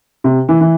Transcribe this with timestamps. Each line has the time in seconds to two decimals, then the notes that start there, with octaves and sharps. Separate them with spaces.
0.24 C3
0.49 E3
0.61 E3